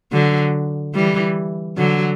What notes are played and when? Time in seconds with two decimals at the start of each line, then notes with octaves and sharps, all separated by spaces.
0.12 D3 F#3
0.95 E3 G3
1.78 D3 F#3